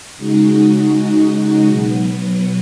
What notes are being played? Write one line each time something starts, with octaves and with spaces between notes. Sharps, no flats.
C#3 G#3 D#4 F#4
B2 F#3 B3